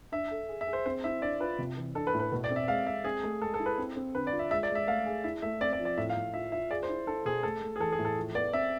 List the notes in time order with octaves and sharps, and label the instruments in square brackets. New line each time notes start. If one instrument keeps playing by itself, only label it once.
[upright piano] D4 [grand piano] E5
[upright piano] A4
G#4
[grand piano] E5
[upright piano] G#4
[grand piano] C5
[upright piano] C4 [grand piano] C5
[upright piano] E4 [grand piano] E5
[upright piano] D4 [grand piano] D5
[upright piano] F4 [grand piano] B4
[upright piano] C3
E3
[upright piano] D4 [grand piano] A4
[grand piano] B4
[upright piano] A2
[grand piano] B4
[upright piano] B2
[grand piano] D5
[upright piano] C4
[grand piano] E5
[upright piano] G#3 [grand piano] F5
[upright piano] G#3 [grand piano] E5
[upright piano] C4 [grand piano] G#4
[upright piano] A3
[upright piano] G#3 [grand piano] A4
[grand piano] A4
[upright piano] E4
[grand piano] B4
[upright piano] C4
C4
[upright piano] D3 [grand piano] B4
[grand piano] D5
[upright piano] F4
[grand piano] E5
[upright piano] G#3 [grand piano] E5
[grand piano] D5
[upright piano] G#3
[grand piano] E5
[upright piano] A3 [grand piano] F5
[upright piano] G#4
[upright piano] E4 [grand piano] E5
[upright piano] A3 [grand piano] E5
[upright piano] C4 [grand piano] D5
[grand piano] D5
[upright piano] F3
[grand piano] D5
[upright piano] A2 [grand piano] E5
[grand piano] F5
[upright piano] A2
[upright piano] F4 [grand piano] E5
[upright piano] F4 [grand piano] E5
[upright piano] G#4 [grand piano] D5
[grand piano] C5
[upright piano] E4
[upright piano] E4 [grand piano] A4
[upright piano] B2 [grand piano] G#4
[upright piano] A3 [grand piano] A4
[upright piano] A3
[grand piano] G#4
[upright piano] E3 [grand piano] A4
[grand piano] G#4
[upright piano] A2
[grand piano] A4
[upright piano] F3
[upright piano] B3 [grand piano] D5
[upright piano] C4 [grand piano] E5